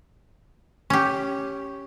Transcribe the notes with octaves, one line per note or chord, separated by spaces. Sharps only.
C#4 G4